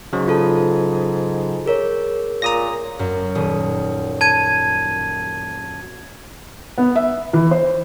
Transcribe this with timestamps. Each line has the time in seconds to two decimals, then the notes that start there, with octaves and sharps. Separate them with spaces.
0.13 G#2 C#3 F#3
0.28 F4 A4 A5
1.66 G#4 A#4 C#5
2.42 A#2 A#5 D#6 A#6
2.99 F#2
3.35 D#1 D#6
4.21 A5 G#6 D#7
6.78 B3
6.96 E5
7.33 E3
7.51 C5